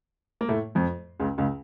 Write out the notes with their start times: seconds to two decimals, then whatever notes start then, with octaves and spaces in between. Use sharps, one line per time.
0.41 A#3
0.48 A2 A3
0.75 F2 F3
1.20 C#2 C#3
1.38 C#2 C#3